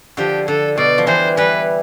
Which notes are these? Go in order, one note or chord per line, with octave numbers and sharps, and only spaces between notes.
D3 F3 G4
D3 A4
B2 D5
F3
E3 G3 C5
E3 G3 B4